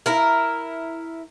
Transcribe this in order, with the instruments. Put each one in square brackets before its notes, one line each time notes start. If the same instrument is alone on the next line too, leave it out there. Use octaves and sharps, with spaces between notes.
[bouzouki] E4 A#4